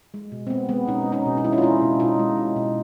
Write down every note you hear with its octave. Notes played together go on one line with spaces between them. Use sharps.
G#3
B2
C4
G#3 B3
G#3 B3
B2 C#4 D#4
G#3
C#4 D#4
B2
D#4
G#3 E4
C#4 D#4
F4
G#3 D4 E4
B2
B2 D#4 F4
G#3
B2
B2